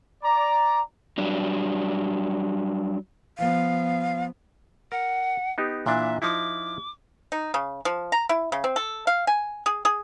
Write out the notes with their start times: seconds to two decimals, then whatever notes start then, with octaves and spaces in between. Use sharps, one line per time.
0.23 D5 A#5
1.18 F#3 G3 D4
3.38 F3 B3 F5
4.92 A#4 F#5
5.58 B3 D#4 G4
5.86 A#2 E3 D4 E5
6.22 F3 D#4 E4 D6
7.32 D#4
7.54 C#3
7.85 F3
8.12 A#5
8.29 E4
8.52 C#3
8.64 C4
8.76 A4
9.07 F5
9.27 G#5
9.66 G#4
9.85 G#4